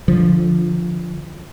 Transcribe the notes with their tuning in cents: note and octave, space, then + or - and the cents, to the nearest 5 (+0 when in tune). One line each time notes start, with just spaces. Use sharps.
D3 +0 F3 -5